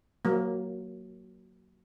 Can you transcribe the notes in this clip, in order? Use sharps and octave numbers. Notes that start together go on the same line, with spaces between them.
F#3 A#3